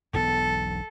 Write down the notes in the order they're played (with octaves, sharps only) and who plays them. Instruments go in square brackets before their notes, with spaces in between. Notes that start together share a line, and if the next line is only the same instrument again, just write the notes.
[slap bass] E1 B1 B3 [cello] A4